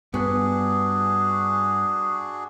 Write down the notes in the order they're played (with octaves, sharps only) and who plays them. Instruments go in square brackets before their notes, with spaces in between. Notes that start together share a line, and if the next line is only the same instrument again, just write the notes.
[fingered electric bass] G2 [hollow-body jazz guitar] B3 [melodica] D4 F#4 G#4